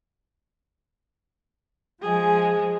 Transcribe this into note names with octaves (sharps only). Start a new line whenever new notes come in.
F3 G#3 G#4